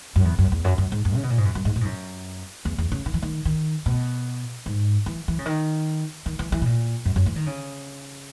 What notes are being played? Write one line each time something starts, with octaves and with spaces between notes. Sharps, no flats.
F#2
E2
F#2
E2
F#2
F#2
G#2
F#2
C#3
B2
A#2
G#2
F#2
F#2
G#2
A#2
G#2
F#2
E2
E2
C#3
D#3
E3
D#3
D#3
B2
G#2
E3
E3
C#3
D#3
D#3
E3
E3
B2
A#2
F#2
F#2
E3
D#3
C#3